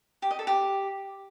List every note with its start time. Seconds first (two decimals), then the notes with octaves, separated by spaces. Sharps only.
0.22 G4
0.31 D#5
0.39 A4
0.47 G4